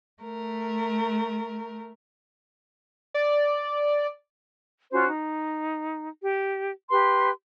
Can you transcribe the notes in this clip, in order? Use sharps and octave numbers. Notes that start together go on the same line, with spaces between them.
A3 A#4
D5
C#4 F4 F#4 C5
D#4
G4
G4 B4 C6